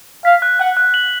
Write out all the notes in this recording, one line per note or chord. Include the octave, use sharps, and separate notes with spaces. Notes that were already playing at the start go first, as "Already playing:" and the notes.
F5 B6
F#6
F#5 F#6
F#6
F#7